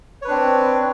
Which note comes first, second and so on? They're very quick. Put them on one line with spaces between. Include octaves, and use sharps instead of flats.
C#5 B4 D4 C4